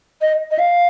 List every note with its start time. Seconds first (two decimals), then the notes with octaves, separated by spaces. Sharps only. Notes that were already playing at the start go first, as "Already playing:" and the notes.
0.21 D#5
0.51 D#5
0.59 F5